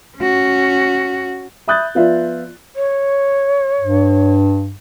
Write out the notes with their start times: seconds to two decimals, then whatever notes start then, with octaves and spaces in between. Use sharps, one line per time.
0.18 C#4 F#4
1.68 E5 B5 D#6 F#6 G6 A6
1.95 F3 B3 F4 D5 E5
2.76 C#5
3.81 G2